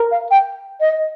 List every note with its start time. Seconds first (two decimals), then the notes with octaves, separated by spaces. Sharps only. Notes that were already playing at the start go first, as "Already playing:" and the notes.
Already playing: A#4
0.11 F5
0.31 G5
0.81 D#5